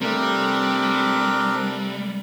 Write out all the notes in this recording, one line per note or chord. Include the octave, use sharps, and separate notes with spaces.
C3 G3 A3 C4 D4 A#4